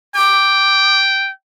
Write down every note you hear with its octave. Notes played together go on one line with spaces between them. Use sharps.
G5 D6